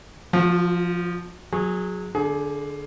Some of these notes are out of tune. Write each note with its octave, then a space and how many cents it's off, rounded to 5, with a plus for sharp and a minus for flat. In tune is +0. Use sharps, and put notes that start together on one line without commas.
F3 +0 F#4 -45
F#3 -20 G#4 +0
D3 +0 G#4 +30